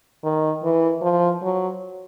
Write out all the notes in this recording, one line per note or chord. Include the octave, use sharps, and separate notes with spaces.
D#3
E3
F3
F#3